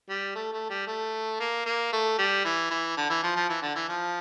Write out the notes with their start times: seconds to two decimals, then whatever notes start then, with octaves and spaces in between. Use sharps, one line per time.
0.09 G3
0.35 A3
0.53 A3
0.70 G3
0.87 A3
1.40 A#3
1.66 A#3
1.92 A3
2.18 G3
2.45 E3
2.70 E3
2.97 D3
3.10 E3
3.23 F3
3.36 F3
3.49 E3
3.62 D3
3.75 E3
3.88 F3